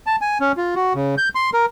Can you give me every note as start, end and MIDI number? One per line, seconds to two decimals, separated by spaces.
0.07 0.16 81
0.21 0.38 80
0.40 0.52 61
0.57 0.75 65
0.75 0.93 66
0.94 1.15 49
1.18 1.29 91
1.35 1.50 84
1.53 1.66 70